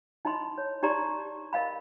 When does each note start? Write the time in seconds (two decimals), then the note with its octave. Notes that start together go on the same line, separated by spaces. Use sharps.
0.25 D#4 E4 D#5 B5 C6
0.58 C#5
0.83 D#4 G4 D5 A#5 C6
1.53 A#4 D#5 F5 B5